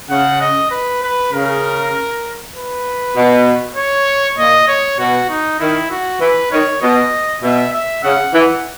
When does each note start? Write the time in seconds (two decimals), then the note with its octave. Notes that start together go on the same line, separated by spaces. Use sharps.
0.10 C#3 F#5
0.41 D#5
0.71 B4
1.03 B4
1.33 C#3 A#4
2.55 B4
3.16 B2
3.76 C#5
4.38 A#2 D#5
4.68 C#5
4.99 B2 F#4
5.30 D#4
5.60 D#3 E4
5.91 F#4
6.21 E3 B4
6.52 D#3 C#5
6.82 B2 D#5
7.43 B2 E5
7.73 E5
8.04 C#3 F#5
8.34 E3 F#5